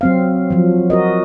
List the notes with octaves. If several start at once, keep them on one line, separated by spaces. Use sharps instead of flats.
F#3 C4 F5
F3 F#3
F#4 A#4 D#5